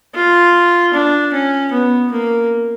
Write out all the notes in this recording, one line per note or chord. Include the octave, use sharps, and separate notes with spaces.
F4
D4
C#4
B3
A#3